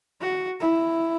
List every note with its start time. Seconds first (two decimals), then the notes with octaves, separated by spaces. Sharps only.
0.21 F#4
0.60 E4